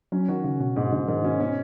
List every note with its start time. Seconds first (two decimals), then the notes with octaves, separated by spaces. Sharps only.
0.12 F#3 C#4
0.28 D#3 F#4
0.44 C#3 C#4
0.60 B2 F#4
0.76 G#2 B2
0.92 G#2 C#3
1.08 G#2 D#3
1.24 B2 C#4
1.40 B2 C#4